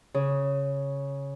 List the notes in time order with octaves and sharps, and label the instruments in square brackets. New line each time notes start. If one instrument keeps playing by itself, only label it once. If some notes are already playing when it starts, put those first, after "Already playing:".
[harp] C#3